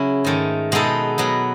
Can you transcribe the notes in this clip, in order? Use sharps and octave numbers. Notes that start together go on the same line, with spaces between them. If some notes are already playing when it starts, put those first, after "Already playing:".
Already playing: C#3 F#3 C#4 E4
G#2 D#3 A3
B2 G#3 B3 D#4 A4
B2 F#3 B3